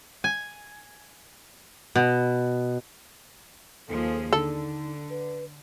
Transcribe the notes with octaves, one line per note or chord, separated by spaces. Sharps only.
G#5
B2
D#2 F3 G#4 A4
D3 D#4 A4
B4